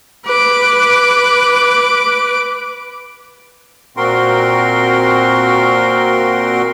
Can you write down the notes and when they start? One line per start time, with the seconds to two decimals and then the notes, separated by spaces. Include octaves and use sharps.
0.25 B4 D6
3.97 A#2 C4 F#4 A#4 C6